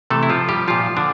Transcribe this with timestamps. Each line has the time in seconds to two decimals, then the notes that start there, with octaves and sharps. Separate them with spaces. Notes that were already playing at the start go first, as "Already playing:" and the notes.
0.10 C3 E3 A3 A4
0.23 E4
0.29 F3 F4
0.49 G3 G4
0.68 A#2 F3 F4
0.97 D3 D4